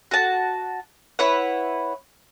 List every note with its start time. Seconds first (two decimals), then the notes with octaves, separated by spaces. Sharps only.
0.11 F#4 A5
1.19 E4 B4 C#5 F#5